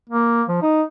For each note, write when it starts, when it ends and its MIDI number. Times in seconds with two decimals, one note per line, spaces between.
0.10 0.43 58
0.49 0.58 53
0.62 0.82 63